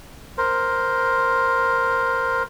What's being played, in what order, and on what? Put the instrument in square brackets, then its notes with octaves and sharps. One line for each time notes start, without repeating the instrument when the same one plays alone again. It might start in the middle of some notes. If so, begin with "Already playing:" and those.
[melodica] A#4 C5